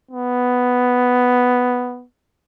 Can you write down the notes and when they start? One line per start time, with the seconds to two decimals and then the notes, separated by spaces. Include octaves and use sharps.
0.11 B3